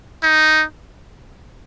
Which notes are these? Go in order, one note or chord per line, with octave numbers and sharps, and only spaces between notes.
D#4